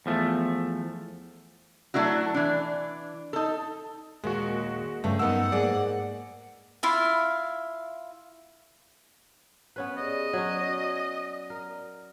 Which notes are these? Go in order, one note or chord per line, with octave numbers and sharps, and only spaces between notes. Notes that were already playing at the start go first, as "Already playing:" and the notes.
E2 F3 A3
F#3 A3 D4 E4 F#4
E3 D4
D#4 A4
D#2 A#2 G#3 F#4
G2 C#3 A3
G2 B3 D#4 A#4 F#5 E6
G#2 A#3 G#4 D5
E4 F4 E5 F5
B3 C#4 B4
G4 G#4 D5 D#5
F#3 C#4 D5
A#4